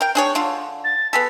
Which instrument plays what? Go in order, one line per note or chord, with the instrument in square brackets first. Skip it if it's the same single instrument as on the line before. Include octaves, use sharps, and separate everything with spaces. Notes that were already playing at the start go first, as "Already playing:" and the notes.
[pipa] A#4 G5
D4 G#4 C#5
D3 D4 F4
[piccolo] A6
[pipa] B3 G#4 A4 [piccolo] B6